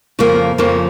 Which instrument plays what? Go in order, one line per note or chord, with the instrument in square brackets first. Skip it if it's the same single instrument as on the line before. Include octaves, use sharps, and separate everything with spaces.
[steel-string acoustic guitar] F2 C#3 F3 A#3
F2 C#3 F3 A#3